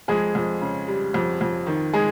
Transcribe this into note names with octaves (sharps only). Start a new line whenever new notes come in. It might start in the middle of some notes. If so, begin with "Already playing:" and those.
F2 G#3 G#4
F2
C#3
G3
F2
F2
D#3
G#3 G#4